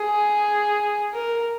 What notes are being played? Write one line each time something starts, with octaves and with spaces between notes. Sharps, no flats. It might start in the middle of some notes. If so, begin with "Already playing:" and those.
Already playing: G#4
A#4